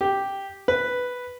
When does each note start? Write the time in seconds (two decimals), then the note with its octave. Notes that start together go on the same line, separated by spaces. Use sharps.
0.01 G4
0.68 B4